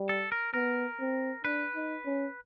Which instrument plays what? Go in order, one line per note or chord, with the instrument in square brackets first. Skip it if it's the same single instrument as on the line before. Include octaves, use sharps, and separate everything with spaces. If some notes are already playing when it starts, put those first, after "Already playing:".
Already playing: [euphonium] G3
[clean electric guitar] A4
A#4
[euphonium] B3 [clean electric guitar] A#4
[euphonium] C4
[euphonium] D4 [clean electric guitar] B4
[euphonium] D#4
C#4